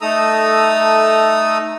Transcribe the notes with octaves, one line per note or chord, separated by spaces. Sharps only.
A3 D#4 A4 A#5 D#6 E6